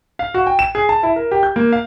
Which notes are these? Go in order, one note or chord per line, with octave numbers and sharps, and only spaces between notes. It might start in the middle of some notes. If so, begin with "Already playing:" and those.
F5
F#4
G5
E7
G#4
A5
E4
A#4
G4
G6
A#3
F5